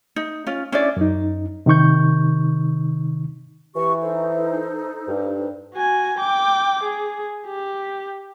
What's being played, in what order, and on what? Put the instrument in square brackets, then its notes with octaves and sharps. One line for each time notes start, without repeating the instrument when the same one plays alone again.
[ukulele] D#4
C#4 F4
C#4 D4 E4 D5
[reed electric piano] F#2 D#4
C3 D#3 D#4 C#6 G6
[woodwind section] E3 [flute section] G4 C#6
[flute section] D#4 A4 C5
[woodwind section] G2
[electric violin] F#4 G#5
G5 D6
G#4
G4